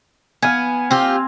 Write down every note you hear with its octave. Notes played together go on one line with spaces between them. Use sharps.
B3 F5 G#5
C4 F4 G4